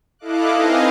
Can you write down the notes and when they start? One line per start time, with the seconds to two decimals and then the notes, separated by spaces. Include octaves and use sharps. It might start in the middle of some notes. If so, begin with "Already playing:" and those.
0.19 E4 A4 D#5 F5 D6 F#6
0.53 C4 D#4 B4 D#5 F5 G#5